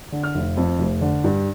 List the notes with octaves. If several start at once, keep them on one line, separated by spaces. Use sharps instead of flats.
D3
F6
F1
F2
F1
D3
G2